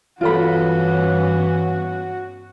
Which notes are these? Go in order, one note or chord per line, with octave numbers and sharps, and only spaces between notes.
G2 E3 B3 C#4 F4 F#4 A4 B5